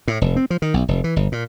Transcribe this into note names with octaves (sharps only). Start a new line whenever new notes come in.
A2
F1
C4
F3
D#3
B1
F1
E3
G1
A#2